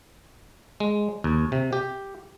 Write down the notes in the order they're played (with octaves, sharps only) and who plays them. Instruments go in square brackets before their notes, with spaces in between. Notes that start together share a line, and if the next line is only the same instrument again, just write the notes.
[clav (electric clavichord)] G#3
D#2
C3
G4